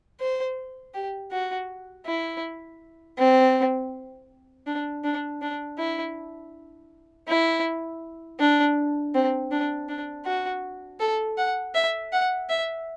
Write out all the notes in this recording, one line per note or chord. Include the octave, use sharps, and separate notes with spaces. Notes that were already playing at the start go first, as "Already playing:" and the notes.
C5
G4
F#4
E4
C4
D4
D4
D4
E4
E4
D4
C4
D4
D4
F#4
A4
F#5
E5
F#5
E5